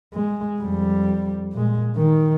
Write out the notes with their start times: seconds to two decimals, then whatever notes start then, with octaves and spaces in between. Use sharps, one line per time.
0.14 G#3
0.59 F2 G3
1.53 A#2 G#3
1.96 D#3